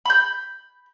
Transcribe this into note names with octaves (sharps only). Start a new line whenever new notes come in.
B5 G6